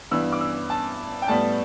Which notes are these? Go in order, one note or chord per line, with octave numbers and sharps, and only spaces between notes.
G2 E3 B3 E6
D6
E6
A5
G5
A2 G3 B3 A5